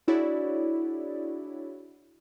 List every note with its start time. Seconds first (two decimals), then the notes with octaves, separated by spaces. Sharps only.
0.08 D4 E4 F#4 G#4 C#5 D5